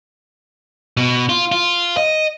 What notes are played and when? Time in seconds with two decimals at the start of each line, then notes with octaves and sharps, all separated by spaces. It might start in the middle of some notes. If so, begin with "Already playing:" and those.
0.97 B2
1.29 F4
1.52 F4
1.97 D#5